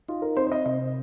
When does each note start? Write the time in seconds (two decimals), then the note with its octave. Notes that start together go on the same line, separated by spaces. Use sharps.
0.09 D#4 F4
0.22 A#4
0.37 C4 C5
0.47 C5
0.52 D#5
0.66 C3 D#5